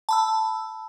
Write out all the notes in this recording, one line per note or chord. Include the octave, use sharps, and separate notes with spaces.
A5 B5 E6